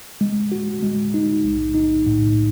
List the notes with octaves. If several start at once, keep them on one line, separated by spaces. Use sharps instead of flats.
G#3
F#4
G#3
D#4
B1
D#4
A2